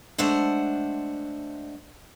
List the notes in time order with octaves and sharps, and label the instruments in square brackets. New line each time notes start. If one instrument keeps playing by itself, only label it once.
[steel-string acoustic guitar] G#3 A3 D4 C5 F#5